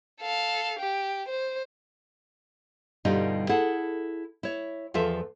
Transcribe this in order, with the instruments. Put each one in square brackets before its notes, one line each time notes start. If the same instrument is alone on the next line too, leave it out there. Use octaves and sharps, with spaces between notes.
[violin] A4 F5
G4
C5
[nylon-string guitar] G2 B2 D3 G3 D#4 F4
E4 G#4 A4 F#5
E4 C#5
E2 F3 F4 A4 E5